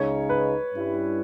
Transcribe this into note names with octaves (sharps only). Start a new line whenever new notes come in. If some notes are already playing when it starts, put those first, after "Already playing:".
Already playing: C#2 C#3 G#3 D#4 C#5
B4
G2 G3 C#4 E4